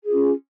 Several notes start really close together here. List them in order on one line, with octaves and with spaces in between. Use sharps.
G#4 F4 C#4